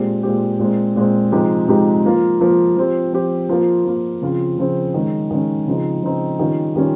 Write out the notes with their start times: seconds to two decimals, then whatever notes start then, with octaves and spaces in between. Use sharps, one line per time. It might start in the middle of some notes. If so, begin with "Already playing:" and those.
Already playing: A#2 G#3 C4 G4
0.23 A#2 G#3 C4 G4
0.59 A#2 G#3 C4
0.96 A#2 G#3 C4
1.32 C3 F3 G#3 D#4 G4
1.68 C3 F3 G#3 D#4 G4
2.05 F3 A#3 F4
2.41 F3 A#3 F4
2.77 F3 C4 G4
3.13 F3 C4 G4
3.49 F3 A#3 F4
3.85 F3 A#3 F4
4.22 C#3 F3 C4 F4
4.58 C#3 F3 C4 F4
4.94 D#3 G#3 C#4
5.31 D#3 G#3 C#4
5.67 C#3 F3 C4 D#4
6.03 C#3 F3 C4 D#4
6.39 D#3 G3 C#4 F4
6.75 D#3 G3 C#4 F4